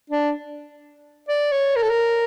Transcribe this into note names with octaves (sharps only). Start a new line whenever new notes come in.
D4
D5
C#5
A#4
A4
A#4